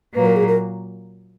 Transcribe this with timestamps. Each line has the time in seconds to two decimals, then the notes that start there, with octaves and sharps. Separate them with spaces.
0.14 A#2 F#3 A#3 B4
0.25 A#4
0.36 G#4
0.48 A#4